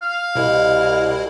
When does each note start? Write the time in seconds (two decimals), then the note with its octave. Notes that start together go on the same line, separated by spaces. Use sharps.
0.02 F5
0.36 C2 B2 E4 D#5